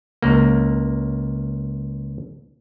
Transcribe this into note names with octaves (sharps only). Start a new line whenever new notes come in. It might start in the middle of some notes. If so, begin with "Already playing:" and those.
C#2 A#3